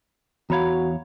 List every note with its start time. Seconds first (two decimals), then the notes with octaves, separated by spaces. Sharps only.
0.50 E2 F#4 C#5 F5 A#5 B5 G#6